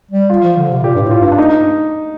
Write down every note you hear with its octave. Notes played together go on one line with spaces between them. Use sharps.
G3
F4
F3
D3
C3
A#2 G4
G2
A2
F4
G2
D4
D#4